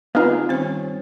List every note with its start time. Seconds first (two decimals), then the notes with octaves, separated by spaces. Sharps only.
0.15 D2 B3 C4 D#4 F4 G#4 F5
0.49 G2 D#3 C4 C#4 C5